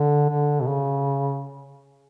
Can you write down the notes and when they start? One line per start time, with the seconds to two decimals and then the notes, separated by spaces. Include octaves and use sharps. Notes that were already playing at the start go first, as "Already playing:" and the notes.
Already playing: D3
0.30 D3
0.61 B2
0.68 C#3